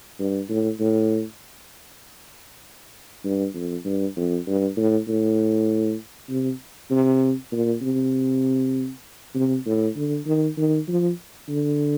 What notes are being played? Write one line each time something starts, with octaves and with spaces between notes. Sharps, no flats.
G2
A2
A2
G2
F2
G2
F2
G2
A2
A2
C3
C3
A#2
C3
C3
A2
D3
D#3
D#3
F3
D3